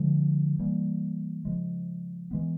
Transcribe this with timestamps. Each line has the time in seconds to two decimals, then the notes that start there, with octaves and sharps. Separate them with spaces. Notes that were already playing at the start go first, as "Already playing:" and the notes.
Already playing: D3 F3 G#3
0.59 E3 G3 A#3
1.45 C#3 F3 G#3
2.31 E3 G#3 B3